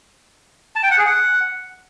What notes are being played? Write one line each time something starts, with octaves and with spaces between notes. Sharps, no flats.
A5
G5
F#5
G#4
F#5